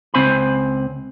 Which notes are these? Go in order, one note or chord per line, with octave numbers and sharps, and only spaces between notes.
C#2 C4 C5 G#5 B5